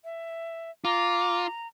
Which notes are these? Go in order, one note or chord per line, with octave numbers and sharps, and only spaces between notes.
E5
F4 A#5 D6